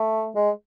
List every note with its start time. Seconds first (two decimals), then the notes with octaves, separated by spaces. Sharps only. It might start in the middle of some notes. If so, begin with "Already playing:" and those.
Already playing: A3
0.35 G#3